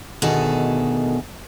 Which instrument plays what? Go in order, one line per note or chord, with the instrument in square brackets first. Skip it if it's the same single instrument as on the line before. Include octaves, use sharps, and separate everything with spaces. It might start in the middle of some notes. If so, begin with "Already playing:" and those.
[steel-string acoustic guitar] D2 B2 D#3 G#4 A4